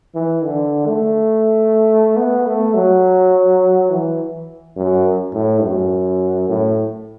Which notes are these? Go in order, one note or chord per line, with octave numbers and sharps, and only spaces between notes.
E3
D3
A3
B3
A3
F#3
E3
F#2
A2
F#2
A2